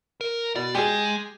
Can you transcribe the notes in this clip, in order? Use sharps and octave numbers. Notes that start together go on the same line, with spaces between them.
A#4
B2 D5
G#3 G4 G#4